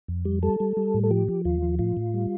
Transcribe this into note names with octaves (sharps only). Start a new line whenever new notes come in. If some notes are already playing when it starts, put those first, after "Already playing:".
F2
G3
G3 A4
G3
G3
A2
A4
F3 G4
F3
D#2 F4
F3
A2 F4
A2
G3